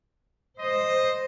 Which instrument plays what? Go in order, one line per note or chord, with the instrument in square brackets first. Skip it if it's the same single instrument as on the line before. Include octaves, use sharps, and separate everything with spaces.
[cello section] C5 [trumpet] D#5